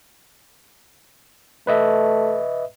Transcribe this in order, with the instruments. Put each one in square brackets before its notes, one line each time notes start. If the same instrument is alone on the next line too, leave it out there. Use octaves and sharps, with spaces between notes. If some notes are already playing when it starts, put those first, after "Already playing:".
[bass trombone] A3 [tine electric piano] B4 D#5 E5